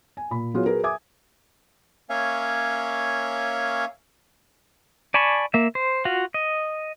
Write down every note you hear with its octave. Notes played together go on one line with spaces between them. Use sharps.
G#5
A#2 B5
F#3 B3 F4 F#4 G#4 C#5
F#4 G#4 A#4 B4
E5 G#5 D6 D#6 G#6
A#3 C#4 C#5 E5 F5 G#5
D5 G#5 A5 B5 C#6
A#3 E5
C5
F4 F#4 F5
D#5